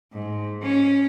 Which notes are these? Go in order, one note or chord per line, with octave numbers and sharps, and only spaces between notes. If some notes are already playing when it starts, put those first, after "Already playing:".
G#2
C#4